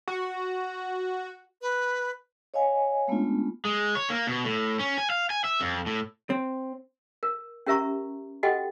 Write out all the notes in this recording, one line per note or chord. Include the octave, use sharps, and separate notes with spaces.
F#4
B4
C#5 D#5 F5 G#5
G#3 A3 B3 C#4 D4 F4
G#3
C#5
A#3
B2
A2
C#4
G#5
F5
G#5
E5
F2
A2
C4
A#4
C#4 G4 A#4 E5 A#5 C#6
F#4 G4 A4 D#5 F#5 G5